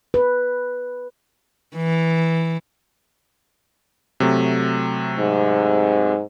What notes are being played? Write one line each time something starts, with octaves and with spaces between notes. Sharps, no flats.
B4
E3
C3 F#3 A3
G#2